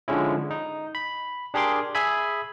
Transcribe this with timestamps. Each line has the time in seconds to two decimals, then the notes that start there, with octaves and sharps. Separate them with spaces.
0.08 D3 F3 G#3 C#4 E4
0.51 D#4
0.95 B5
1.54 D4 G4 G#4 A#4 C6 D6
1.95 G#4 E5 G#5 B5